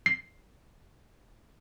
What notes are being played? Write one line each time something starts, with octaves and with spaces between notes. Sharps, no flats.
C7